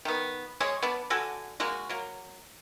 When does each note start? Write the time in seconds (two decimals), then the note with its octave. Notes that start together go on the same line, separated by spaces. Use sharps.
0.05 D#3 B3
0.60 G#3 G#4 C#5
0.82 B3 D4
1.10 D3 F#4 A4 G#5
1.60 G#3 A#3 F#4
1.89 F#3 A#3